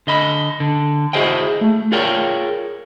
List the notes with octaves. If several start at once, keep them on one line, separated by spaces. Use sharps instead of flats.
D3 D#5 B5
D3
E4 F#4 G#4 C5 D#5 G5
A3
F4 G#4 A#4 C#5 D5 G5